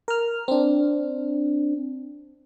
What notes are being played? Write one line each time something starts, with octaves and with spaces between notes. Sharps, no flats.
A#4 F6
C4 D4